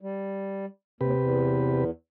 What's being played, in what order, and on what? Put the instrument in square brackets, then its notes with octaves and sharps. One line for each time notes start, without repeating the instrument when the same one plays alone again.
[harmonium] G3
[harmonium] D#2 [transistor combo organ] C3 G4 B4
[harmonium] E2